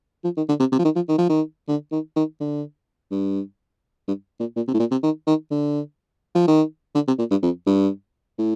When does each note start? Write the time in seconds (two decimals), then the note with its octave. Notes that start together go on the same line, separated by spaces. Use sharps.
0.24 F3
0.37 D#3
0.49 D3
0.60 C3
0.72 C3
0.79 F3
0.85 D#3
0.96 F3
1.08 D#3
1.18 F3
1.29 D#3
1.68 D3
1.92 D#3
2.16 D#3
2.40 D3
3.11 G2
4.08 G2
4.40 A#2
4.56 A#2
4.68 C3
4.74 A2
4.80 A#2
4.91 C3
5.03 D#3
5.27 D#3
5.51 D3
6.35 F3
6.47 D#3
6.95 D3
7.07 C3
7.19 A#2
7.31 G2
7.43 F2
7.66 G2
8.38 A2